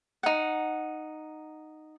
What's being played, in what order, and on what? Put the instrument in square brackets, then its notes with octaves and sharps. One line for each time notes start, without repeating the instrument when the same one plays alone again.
[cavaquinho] D#4 F#5